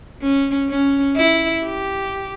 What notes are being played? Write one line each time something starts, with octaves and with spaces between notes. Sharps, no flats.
C#4
C#4
E4
G4